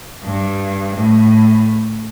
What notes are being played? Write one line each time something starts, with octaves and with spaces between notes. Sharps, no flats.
G2
A2